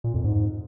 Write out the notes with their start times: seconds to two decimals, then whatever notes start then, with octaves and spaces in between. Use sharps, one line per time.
0.04 A#2
0.14 F2
0.24 G#2